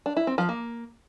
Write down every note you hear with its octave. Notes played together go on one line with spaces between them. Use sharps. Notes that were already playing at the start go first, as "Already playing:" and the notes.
D4
E4
C4
F3
A#3